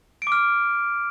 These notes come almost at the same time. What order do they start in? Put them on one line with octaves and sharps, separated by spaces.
D7 D6 F6